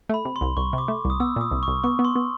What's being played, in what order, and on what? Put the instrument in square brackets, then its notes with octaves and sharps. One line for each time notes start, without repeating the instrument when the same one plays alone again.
[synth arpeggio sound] A3 [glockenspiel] B5
[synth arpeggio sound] C3
[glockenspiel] C6
[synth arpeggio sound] C2
[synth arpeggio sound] C2 [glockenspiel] C#6
[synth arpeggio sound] C3
[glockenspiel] D6
[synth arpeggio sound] A3
[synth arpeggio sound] C2 [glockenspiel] D#6
[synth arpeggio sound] B3 [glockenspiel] E6
[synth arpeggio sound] A#2 [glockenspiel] D#6
[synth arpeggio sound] C2
[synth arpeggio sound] C2 [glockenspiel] C#6
[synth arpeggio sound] B3 [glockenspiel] C#6
[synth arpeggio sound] B3
[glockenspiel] C6
[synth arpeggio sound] B3